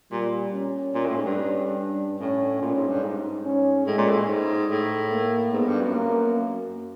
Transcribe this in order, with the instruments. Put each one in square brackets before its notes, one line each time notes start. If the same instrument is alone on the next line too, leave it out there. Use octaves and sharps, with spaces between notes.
[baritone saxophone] A#2 [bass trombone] G3
[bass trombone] C#4
[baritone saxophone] A#2
A2
G#2
G2
[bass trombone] C#4
D4
[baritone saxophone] A2 [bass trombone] C#4
[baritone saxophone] A#2 [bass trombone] C#4
[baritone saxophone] G#2
G2
G#2
[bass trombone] C#4
[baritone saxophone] A2 [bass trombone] G#3
[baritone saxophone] A#2
A2
G#2
[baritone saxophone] A2 [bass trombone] A3
[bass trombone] A#3
[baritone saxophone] G#2 [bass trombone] B3
[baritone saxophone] G2
F#2
[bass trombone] A#3